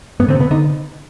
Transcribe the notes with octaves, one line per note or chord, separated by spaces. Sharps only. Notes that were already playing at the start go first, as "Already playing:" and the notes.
G2 B3
D3 C4
C3
B3
D3 D#4